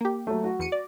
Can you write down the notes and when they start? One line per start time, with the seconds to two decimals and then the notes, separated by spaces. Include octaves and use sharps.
0.01 A#3 G4
0.27 F#3 A3
0.44 F#4
0.59 E2 C#7 D#7
0.72 D5